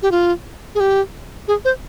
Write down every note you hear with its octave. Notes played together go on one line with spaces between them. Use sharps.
G4
F4
G#4
G4
G#4
C5